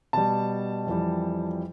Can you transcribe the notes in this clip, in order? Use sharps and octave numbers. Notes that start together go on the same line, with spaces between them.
B2 G3 A5
F2 E3 G3